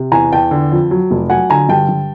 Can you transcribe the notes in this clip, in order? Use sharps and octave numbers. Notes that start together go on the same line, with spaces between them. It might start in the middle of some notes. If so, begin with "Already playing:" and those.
Already playing: C3
E2 G#5 A#5
E2 G5 A5
D3
F2
F#3
F1
F#3 F#5 G#5
D3 G#5 A#5
G2 G5 A5
G2